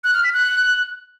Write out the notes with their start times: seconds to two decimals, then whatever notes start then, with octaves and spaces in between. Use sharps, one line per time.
0.04 F#6
0.14 F6
0.24 B6
0.34 F#6